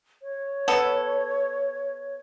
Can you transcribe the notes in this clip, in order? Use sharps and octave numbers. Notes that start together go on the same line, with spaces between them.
C#5
B3 A4